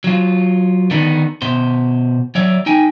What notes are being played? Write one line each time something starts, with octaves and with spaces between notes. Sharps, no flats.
F#3 F4
D3 D#3 B3 D4 D#4
B2 C5
F#3 C#5 D5 E5
D#4 G5 G#5